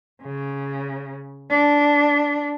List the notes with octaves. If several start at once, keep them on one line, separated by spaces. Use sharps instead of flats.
C#3
D4